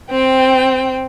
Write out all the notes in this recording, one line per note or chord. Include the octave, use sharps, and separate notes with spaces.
C4 G5